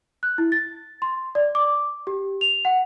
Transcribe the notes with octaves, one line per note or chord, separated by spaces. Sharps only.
F#6
E4
A6
C6
D5
D6
G4
F7
F#5